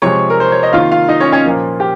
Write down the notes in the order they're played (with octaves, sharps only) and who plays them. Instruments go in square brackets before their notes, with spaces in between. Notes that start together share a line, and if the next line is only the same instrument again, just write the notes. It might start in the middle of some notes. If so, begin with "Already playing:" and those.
[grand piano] C3 F3 G#3 C#5 C#6
A#4
C5
C#5
D#5
C3 D#3 A#3 F4 F5
F4 F5
D#4 D#5
C#4 C#5
C#4 C#5
A#2 F3 A#3
G4